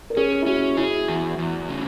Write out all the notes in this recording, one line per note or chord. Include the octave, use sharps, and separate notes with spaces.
A#4
C#4 G#4
E4
C#4 F#4
E4 G#4
E2
E2
C#3